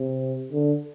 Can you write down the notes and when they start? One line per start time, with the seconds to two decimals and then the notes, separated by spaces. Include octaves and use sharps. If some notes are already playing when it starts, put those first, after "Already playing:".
Already playing: C3
0.52 D3